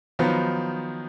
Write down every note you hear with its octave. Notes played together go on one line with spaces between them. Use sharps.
D#3 F3 F#3 B3 D#4